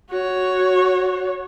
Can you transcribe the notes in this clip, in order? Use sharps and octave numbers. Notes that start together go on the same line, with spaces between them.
F#4 C#5